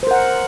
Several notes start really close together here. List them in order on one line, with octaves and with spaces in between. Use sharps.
C5 A#4 F#5